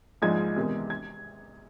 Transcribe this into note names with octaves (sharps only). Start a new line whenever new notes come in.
A#1 G#2 F3 G#3 G#6
E2 C3 D#3 G#3
G#6